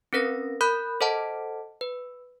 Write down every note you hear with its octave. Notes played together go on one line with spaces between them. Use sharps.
C4 C#4 A#4 B4 A#6
A#4 B5 F#6 G6
A4 C5 D#5 F#5 A5
B4